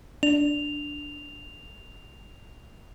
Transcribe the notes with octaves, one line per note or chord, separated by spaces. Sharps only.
D4 F7